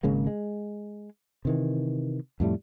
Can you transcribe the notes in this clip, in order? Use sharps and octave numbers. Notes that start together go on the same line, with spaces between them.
G#1 C#3 G#3 A#3
G#3
C3 D#3 E3
F2 A2 G3 A3